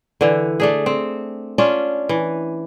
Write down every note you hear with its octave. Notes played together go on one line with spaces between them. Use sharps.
D3 E3
A3 D4 G#4
C4
C#4 D4 F4
E3